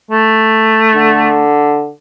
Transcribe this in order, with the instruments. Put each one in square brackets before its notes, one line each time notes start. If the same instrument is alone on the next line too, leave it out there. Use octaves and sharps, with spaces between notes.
[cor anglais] A3
[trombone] D3